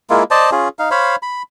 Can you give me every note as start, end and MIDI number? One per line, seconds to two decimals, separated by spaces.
0.10 0.23 56
0.10 0.23 58
0.10 0.23 64
0.10 0.23 65
0.31 0.50 72
0.31 0.50 74
0.31 0.50 75
0.31 0.50 81
0.52 0.68 61
0.52 0.68 65
0.52 0.68 68
0.79 0.90 63
0.79 0.90 77
0.91 1.16 72
0.91 1.16 73
0.91 1.16 77
0.91 1.16 83
1.22 1.42 83